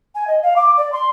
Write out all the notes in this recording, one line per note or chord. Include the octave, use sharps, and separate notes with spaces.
G#5
D#5
F5
D6
D5
C6